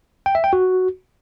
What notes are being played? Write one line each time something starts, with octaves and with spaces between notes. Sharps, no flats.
G5
E5
G5
F#4